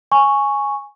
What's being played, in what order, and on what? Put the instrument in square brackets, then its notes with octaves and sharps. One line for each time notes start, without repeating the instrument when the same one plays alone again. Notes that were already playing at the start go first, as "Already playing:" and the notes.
[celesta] G#5 C#6